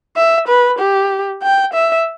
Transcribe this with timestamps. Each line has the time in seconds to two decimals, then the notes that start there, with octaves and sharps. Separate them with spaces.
0.17 E5
0.48 B4
0.79 G4
1.43 G5
1.73 E5